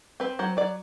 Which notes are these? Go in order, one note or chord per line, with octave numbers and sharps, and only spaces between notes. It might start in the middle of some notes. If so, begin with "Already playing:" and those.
C4 B4
F#3 C5
F#3 D5